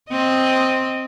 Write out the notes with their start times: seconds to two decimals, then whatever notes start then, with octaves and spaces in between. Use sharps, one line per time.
0.10 C4 D#5